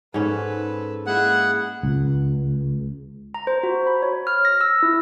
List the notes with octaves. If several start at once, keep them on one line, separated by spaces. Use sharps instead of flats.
G#2 C#4 A4 B4
G#3 A#3 E4 G#4 F#5
C#2
A#5
C5
F#4
B5
C#5
F6
A#6
E6
E4